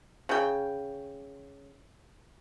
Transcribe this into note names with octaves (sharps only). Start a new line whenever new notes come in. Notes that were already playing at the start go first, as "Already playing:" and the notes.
C#3 G5